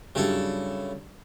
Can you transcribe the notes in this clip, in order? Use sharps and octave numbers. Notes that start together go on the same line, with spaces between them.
G2 C#3 F#3 G3 E4 A4